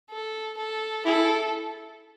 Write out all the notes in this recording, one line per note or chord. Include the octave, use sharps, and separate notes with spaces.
A4
A4
E4 A4